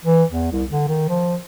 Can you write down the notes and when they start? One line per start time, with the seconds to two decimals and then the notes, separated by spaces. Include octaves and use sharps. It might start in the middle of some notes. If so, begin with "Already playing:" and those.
0.05 E3
0.31 E2
0.52 C2
0.71 D3
0.88 D#3
1.09 F3